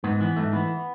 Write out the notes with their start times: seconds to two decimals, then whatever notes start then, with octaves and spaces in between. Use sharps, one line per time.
0.04 G#2 B3
0.21 E3 B3
0.36 G#2 A3
0.53 E3 B3